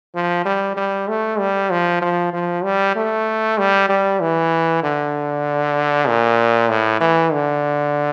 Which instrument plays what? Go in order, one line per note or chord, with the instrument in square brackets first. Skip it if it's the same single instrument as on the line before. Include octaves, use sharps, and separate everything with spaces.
[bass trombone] F3
G3
G3
A3
G3
F3
F3
F3
G3
A3
G3
G3
E3
D3
A#2
A2
E3
D3